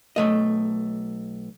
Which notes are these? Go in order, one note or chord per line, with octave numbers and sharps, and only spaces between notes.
B1 F#2 A3 D#5